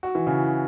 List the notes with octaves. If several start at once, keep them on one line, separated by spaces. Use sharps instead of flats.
F#4
E3
C#3